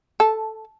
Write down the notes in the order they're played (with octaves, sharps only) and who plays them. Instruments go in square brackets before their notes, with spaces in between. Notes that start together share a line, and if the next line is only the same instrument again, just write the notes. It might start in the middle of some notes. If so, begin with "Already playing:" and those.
[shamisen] A4